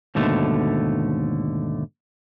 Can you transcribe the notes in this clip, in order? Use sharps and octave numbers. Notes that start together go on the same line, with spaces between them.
D#2 G#2 B2 D3 A3